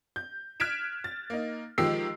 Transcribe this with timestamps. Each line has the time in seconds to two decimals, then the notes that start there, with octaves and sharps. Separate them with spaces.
0.16 G6
0.60 F6 F#6 G#6 B6 D7 E7
1.04 A6
1.30 A#3 D#4
1.78 D#3 F3 G#3 G4 E6 C7